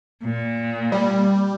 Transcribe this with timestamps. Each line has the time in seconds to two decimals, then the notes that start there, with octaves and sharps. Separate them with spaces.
0.24 A#2
0.92 G3